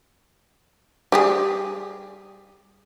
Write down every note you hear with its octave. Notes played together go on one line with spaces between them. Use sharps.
G3 G4 G#4